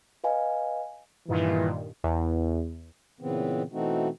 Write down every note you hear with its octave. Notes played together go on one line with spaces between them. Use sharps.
B4 D#5 F5 G#5
G2 A#2 D#3 E3
E2
A#2 C#3 E3 B3 C4
B2 E3 A3 C4 D#4 F#4